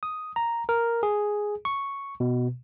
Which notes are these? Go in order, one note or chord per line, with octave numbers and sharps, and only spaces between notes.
D#6
A#5
A#4
G#4
C#6
B2